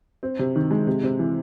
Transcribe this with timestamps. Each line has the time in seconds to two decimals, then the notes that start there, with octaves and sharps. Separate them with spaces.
0.23 C4
0.39 C3
0.56 D#3
0.71 G#3
0.87 C3
1.03 C3
1.19 E3